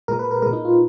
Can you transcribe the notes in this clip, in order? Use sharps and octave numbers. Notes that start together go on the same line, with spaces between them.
A#2 G#3 A#4
B4
A#4
A#2 G#3 A#4
D#4
F4